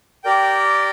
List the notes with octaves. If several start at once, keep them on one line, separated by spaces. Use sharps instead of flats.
G4 A#4 D5 G5